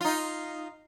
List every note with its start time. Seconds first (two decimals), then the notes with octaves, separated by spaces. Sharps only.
0.01 D#4 F4